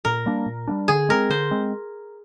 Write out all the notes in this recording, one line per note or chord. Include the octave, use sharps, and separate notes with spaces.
A#2 A#4
G3 A#3 D4
A#2
G3 A#3 D4
D3 G#4
G#3 C4 A#4
D3 C5
G#3 C4